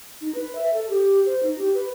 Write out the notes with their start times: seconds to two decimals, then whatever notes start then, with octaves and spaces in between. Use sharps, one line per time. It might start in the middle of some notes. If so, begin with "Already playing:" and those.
0.21 D#4
0.35 B4
0.55 E5
0.73 A4
0.89 G4
1.26 C5
1.43 D#4
1.58 G4
1.74 B4